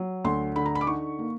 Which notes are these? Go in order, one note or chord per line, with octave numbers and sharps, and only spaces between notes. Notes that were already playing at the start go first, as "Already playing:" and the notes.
Already playing: F#3
D2 C6
D3 B5
A#5
B5
D6
D#4 C#6
A#3